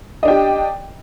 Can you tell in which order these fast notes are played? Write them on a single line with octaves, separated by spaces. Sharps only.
D#5 D4 G5 G4